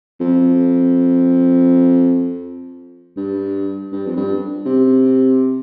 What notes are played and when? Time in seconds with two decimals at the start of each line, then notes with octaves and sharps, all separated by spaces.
0.20 F2
3.17 G2
3.92 G2
4.06 F2
4.17 G2
4.66 C3